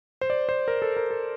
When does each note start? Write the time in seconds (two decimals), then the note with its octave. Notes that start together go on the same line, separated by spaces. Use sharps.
0.21 C5
0.30 D5
0.49 C5
0.68 A#4
0.82 A4
0.97 A#4
1.11 A4